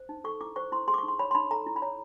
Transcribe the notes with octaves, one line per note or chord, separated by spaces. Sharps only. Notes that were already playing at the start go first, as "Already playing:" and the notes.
Already playing: C5
D#4
A4 C#6
E4 D6
C5 C#6
E4 C6
G#4 C6
D6
C#6
D#4
C6
C#5 B5
C6
D#4 B5
A4 A#5
E4
B5
C#5 A#5